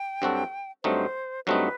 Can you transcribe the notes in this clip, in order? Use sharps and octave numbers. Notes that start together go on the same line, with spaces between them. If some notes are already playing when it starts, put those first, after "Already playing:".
Already playing: G5
G2 F#3 C4 F#4 A4
G2 F#3 A3 C4 D#4 C5
G2 F#3 A3 C4 D#4 B4